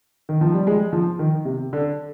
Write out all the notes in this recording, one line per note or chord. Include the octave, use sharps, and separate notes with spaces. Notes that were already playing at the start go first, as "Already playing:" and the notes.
D#3
F3
G3
G#3
F3
D#3
C3
D3